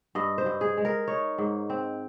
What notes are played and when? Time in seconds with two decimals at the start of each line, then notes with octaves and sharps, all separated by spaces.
0.15 G2 D#5
0.38 C5
0.46 G2
0.61 G#4
0.77 G#3
0.85 A#4
1.08 D#4 C#5
1.38 G#2
1.70 C4